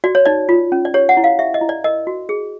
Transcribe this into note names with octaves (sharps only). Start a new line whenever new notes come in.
F#4 D5
C#5
D#4 D5
F4
C#4
D5
G4 C#5
F#5
E4
F5
G4 E5
D#5
E4
D5
A#4 D#5
F#4
G#4